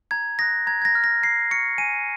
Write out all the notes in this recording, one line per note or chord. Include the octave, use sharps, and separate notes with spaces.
A#5 G#6
D#6 F#6 A#6
A#5 G#6
G#6
A#6
F6
A#6
A#5 C7
C#6 F6 C#7
G#5 D#7